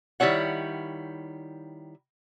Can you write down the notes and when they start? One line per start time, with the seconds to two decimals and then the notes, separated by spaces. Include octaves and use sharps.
0.20 D#3 G3 E4 C#5 F#5